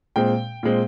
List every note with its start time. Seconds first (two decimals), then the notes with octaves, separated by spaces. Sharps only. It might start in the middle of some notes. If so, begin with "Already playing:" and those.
0.16 A#2 G#3 C4 G5
0.63 A#2 G#3 C4